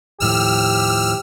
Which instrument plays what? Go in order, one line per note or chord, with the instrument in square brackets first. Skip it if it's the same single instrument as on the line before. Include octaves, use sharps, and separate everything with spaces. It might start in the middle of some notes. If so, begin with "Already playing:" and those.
[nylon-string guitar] D#2 A2 F3 [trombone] G4 [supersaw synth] E6 F6